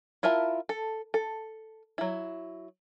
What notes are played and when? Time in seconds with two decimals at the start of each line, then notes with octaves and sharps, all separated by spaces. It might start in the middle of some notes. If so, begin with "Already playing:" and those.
0.23 E4 F4 A#4 E5 A5
0.69 A4
1.14 A4
1.98 F#3 E4